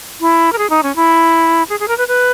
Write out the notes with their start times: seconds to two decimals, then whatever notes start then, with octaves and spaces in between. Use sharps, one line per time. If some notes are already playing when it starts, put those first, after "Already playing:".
0.21 E4
0.52 A#4
0.58 G#4
0.70 D#4
0.83 C#4
0.96 E4
1.69 G#4
1.80 G#4
1.88 A#4
1.98 B4
2.08 B4